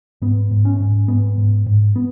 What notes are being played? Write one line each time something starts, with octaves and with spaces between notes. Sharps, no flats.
G#2 B3
G#2
C#4
G#2
G#2 B3
G#2
G#2
B3